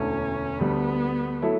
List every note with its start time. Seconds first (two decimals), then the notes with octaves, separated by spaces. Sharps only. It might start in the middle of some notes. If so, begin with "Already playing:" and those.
Already playing: E1 D2 D3 A3 C#4 E4
0.60 D2 D3 G3 B3
1.42 F#3 A3 E4 A4